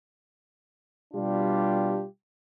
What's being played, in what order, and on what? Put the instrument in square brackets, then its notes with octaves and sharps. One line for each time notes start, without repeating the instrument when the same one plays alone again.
[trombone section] B2 G3 D4 F4 G4